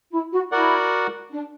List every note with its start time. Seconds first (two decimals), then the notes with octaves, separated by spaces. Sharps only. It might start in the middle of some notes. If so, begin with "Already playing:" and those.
0.11 E4
0.31 F#4
0.51 E4 F#4 A#4 D5 F#5
1.31 D4